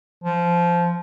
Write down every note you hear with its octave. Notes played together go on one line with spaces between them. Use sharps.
F3